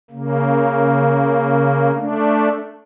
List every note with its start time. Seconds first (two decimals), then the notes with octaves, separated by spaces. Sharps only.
0.11 C#3 A#3
1.95 A3 D4